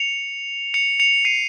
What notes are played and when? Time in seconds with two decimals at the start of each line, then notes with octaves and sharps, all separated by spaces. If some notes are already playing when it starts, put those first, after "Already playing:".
Already playing: C#7 F7
0.74 C#7 F7
1.00 C#7 F7
1.25 C7 D#7